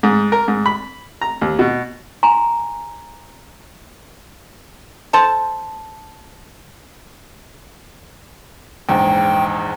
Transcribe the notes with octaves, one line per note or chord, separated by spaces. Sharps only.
G#2
A#4
G#2
B5
A#5
D#2
B2
G#5 A#5 C6
A4 C5 A5
A#1 E2 G#2 G5